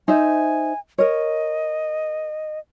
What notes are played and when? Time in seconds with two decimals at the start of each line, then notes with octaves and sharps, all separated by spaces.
0.08 D#4 C5 E5 G#5
0.98 A#4 C#5 D#5